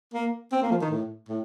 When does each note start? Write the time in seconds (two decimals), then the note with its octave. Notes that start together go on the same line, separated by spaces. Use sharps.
0.14 A#3
0.52 C4
0.62 A#3
0.71 F3
0.82 D#3
0.90 A2
1.29 A2